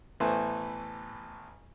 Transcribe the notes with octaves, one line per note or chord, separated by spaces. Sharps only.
A1 E3 A3 B3 C5